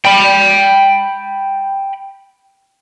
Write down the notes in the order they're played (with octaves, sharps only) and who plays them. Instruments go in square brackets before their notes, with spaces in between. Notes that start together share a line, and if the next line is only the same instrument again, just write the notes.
[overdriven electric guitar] G5 B5